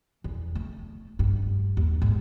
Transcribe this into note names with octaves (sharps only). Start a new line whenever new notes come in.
E2
A3
G2
D#2
G#2